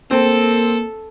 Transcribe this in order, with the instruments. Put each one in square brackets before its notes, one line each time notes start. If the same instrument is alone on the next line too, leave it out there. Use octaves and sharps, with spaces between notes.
[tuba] A#3 [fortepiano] C4 [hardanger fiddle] A4